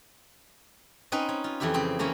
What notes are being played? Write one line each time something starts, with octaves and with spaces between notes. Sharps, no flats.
C4 C#4 D#4 B4
C#4
F4
F2 E3 E4 G4 E5
C#3 C4
E3 A#3 C4 C#4 C#5